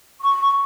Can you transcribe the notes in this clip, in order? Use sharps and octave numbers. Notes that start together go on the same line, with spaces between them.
C#6